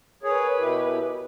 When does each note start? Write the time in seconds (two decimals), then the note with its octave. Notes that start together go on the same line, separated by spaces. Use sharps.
0.23 G#4 A#4 B4 C#5
0.59 B2 E4 G4